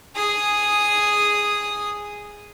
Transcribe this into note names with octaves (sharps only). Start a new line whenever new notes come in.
G#4 D#6